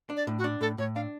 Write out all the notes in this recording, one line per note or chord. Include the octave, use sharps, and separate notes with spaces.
D4
D5
A2
F#4
D4
A2 A4
A2 C#5
D4 F5